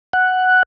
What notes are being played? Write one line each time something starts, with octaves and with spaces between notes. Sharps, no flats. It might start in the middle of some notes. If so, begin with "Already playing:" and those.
F#5